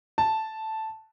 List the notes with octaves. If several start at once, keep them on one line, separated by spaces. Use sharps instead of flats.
A5